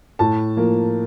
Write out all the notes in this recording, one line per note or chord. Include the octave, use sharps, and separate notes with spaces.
A2 A5
F3 A#3